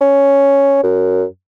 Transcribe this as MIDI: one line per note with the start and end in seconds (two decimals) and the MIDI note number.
0.01 0.82 61
0.83 1.24 42